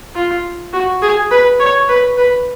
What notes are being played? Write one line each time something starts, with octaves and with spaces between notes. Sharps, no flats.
F4
F#4
G#4
B4
C#5
B4
B4